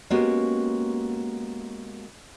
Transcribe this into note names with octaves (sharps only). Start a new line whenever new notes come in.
G#3 A#3 B3 C#4 F#4 G4